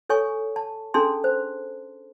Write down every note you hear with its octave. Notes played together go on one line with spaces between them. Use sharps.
A4 C#5 G#5 C#6
A5
C#4 D4 G#4 A4 A5 C6
C5